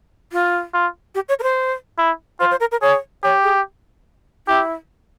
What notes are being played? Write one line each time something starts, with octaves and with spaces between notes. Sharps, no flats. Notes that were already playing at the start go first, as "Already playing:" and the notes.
F4
F4
G4
C#5
A#4
C5
E4
F4 C5
C5
A#4
A#4
G#4 C#5
G4 C#5
G#4
E4 G4